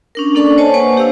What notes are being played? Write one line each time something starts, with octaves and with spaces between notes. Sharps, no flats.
C#4 D4 A#4
A#3 C#4 D4 A4 D5 C#6
C5 C#5 D#5 G#5 A5
A#3 B4 C5 F#5 G#5 C#6
D4 G4 C5 F5 E6